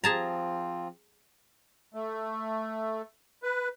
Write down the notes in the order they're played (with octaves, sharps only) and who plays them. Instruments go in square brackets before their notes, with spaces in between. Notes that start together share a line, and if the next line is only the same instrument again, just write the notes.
[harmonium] F3 C4 F4 [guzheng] G#4 A5 A#5
[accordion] A3
B4